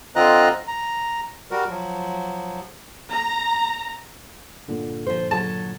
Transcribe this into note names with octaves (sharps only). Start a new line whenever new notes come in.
D3 C4 F4 D#5 A#5 F#6
A#5
G3 F#4 A#4
F3 F#3
A#5
G2 A#2 D3
F3 C5
F#3 A5